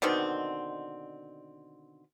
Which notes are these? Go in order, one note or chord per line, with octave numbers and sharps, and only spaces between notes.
B2 D3 D#3 C4